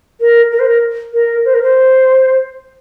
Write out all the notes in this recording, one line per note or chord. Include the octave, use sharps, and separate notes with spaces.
A#4
A#4
C5
A#4
A#4
C5
A#4
C5